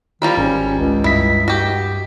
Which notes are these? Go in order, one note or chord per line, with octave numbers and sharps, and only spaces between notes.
D#3 F3 G3 F4 A#5 B5
G#1 C#4
C#2
G2 E4 D#5 B6
F#4 G4